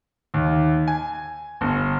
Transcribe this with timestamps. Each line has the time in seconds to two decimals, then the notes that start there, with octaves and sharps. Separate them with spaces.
0.34 D#2
0.88 G#5
1.61 G1